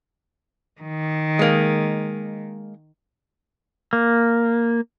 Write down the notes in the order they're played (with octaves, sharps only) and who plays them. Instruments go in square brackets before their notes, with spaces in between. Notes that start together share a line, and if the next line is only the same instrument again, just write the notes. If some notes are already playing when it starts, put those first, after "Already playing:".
[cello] D#3
[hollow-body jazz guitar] G#3 A#3
[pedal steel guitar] A#3